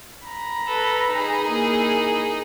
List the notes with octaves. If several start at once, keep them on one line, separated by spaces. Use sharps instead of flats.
A#5 B5
A4 B4
D#4 G#4
A#3 E4